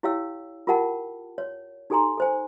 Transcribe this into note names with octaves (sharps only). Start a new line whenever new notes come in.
E4 G4 C#5 F5 G5 E6
F4 G4 A#4 F#5 G5 A5
C#5
D#4 G4 A4 G#5 A#5 C6
A4 C5 G#5